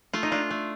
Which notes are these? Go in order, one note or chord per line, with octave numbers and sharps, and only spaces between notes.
A3 F4
D#4
D4 F4
A3